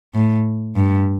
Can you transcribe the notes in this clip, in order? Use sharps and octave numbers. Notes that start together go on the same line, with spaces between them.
A2
G2